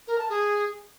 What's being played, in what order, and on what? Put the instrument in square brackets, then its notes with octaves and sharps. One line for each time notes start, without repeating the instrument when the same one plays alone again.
[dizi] A#4
A5
G#4